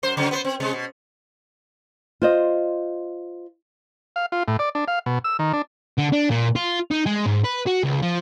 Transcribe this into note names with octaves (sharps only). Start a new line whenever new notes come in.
F#2 C5
C#3 F#3 C#4
B3 B4 C5
C4
C3 G#3
B2
F4 C5 D#5
F5
F4
A2
D5
D4
F5
B2
E6
D#3
D4
D3
D4
A#2
F4
D#4
G#3
G#2
B4
F#4
C#2
F3